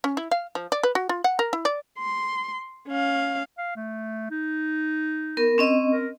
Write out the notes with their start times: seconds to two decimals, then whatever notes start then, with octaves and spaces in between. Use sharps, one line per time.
0.04 C#4
0.17 E4
0.31 F5
0.55 F3
0.72 D5
0.83 B4
0.95 F#4
1.09 F4
1.24 F#5
1.39 A#4
1.53 E4
1.65 D5
1.98 C6
2.88 C#4 F5
3.58 F5
3.76 A3
4.31 D#4
5.37 B3 A#4
5.58 C4 C#4 D#5
5.91 A#4